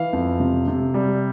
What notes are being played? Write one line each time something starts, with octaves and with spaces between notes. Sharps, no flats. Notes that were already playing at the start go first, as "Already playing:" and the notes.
Already playing: E3 F5
F2
C3
C3
G3